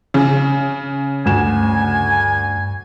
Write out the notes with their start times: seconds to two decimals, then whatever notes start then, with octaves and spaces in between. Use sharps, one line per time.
0.14 C#3
1.26 D2 G2 G#5 E7